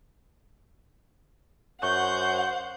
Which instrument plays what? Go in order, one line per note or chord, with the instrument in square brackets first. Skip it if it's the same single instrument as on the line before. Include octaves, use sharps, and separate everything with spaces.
[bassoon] F#2 [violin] C5 F#5 [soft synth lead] C#6 [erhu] G6